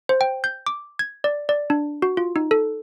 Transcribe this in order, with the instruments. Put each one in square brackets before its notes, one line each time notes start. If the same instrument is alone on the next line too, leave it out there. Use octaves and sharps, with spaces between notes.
[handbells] C5
G5
G6
D6
G#6
D5
D5
D4
F#4
F4
D#4
A4